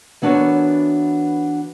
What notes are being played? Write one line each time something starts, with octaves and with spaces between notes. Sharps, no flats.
E3 B3 D4 F#4 A#4 C#5